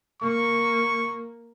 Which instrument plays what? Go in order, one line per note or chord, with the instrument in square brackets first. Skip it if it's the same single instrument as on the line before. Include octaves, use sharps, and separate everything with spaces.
[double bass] A#3 [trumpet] C#6